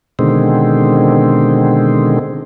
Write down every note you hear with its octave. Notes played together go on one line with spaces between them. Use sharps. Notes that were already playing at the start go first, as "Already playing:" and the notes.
B2 D3 D#3 G#3 C4